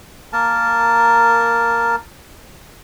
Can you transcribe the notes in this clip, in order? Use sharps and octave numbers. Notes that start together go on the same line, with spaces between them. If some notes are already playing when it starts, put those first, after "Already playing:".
A#3 A#4 A5